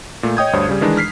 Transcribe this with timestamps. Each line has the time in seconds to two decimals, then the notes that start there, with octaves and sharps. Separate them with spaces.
0.23 A#2 A3
0.37 C#5 D#5 G5 D#6 G6 G#6
0.53 D2 G2 C5 C#5
0.69 C#3 G3
0.81 D#3 E3 G#3 D4 D#4
0.97 F6 B6 C7